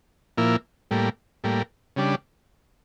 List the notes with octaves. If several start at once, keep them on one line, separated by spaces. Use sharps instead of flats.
A#2 F3 A#3 E4
A2 G3 A#3
A2 G3 A#3
C#3 G3 D4